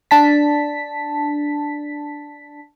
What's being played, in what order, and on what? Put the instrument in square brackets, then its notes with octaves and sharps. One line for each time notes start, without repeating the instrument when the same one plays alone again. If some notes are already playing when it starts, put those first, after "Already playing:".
[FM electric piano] D4 A5 B6